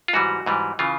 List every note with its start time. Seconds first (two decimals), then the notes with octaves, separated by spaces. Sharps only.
0.08 F4
0.13 G#2 E3 G3 F#4
0.46 G#2 E3 G3
0.79 C#3 E3 F4